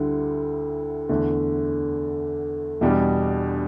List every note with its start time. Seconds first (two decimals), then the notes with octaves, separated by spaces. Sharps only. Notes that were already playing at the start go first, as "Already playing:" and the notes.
Already playing: D2 D3 G3 E4
1.09 E2 D3 A3
2.81 E2 B2 G3 D4